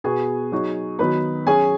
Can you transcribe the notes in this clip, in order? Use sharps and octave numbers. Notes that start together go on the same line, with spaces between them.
B2 B3 F#4 G#4 G#5
F#3 D#4 F#4
D#3 F#3 B3 D#4 B4 B5
F#3 C#4 F#4 G#4 G#5